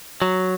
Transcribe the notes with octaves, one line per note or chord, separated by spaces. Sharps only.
F#3